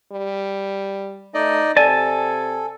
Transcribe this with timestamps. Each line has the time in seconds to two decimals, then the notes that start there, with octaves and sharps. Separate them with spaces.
0.12 G3
1.34 A3 D#4 D5 D#5
1.77 C3 A4 D5 G#5 A5